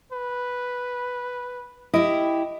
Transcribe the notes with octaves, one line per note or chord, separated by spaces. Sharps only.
B4
E4 G4 D#5